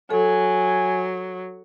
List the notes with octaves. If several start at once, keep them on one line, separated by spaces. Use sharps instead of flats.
F#3 A4 G#5